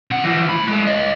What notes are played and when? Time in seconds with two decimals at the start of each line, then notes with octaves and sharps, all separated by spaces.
0.11 C3 F#5
0.24 E3 F3
0.49 A2 B5
0.68 G#3 A4
0.87 C#5 D#5